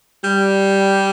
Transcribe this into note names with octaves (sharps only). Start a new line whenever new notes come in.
G3